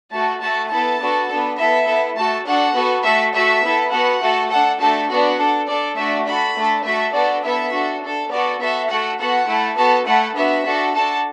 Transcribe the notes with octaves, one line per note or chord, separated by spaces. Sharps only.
A3 F#4 A4 A5
A3 F#4 A4 A5
B3 E4 A4 A5
B3 D4 F#4 A4
B3 D4 A4
B3 E4 A4 E5
B3 E4 A4
A3 F#4 A4 A5
D4 F#4 A4 F#5
B3 F#4 A4
A3 F#4 A4 E5
A3 F#4 A4 E5
B3 E4 A4
B3 F#4 A4 F#5
A3 F#4 A4
D4 A4 F#5
A3 D4 F#4 A4 A5
B3 D4 F#4 F#5
D4 A4
D4 A4 D5
A3 D4 F#4 E5
D4 F#4 A4 B5
A3 D4 A4
A3 F#4 A4 E5
B3 D4 F#4 A4 D5
B3 E4 A4 E5
D4 F#4 A4
D4 A4
B3 F#4 A4 D5
B3 F#4 A4 E5
A3 F#4 A4 F#5
B3 F#4 A4 F#5
A3 E4 A4
B3 F#4 A4 A5
A3 E4 A4 F#5
B3 D4 F#4 E5
D4 F#4 A4
D4 F#4 A4 A5